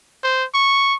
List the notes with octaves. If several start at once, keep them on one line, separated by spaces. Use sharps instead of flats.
C5
C#6